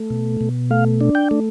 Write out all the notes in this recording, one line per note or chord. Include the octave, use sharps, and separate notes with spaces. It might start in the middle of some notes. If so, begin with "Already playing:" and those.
Already playing: A3
B2
B2
A3 F5
D4
G5
A3